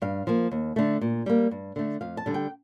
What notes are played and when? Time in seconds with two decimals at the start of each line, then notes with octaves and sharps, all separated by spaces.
0.02 G2 F5
0.27 F3 A#3
0.51 D#2
0.76 D3 A3
1.01 A#2
1.26 G3 A#3
1.51 G2
1.76 D3 A3
2.01 F2 F5
2.17 A5
2.26 D3 G3
2.34 G5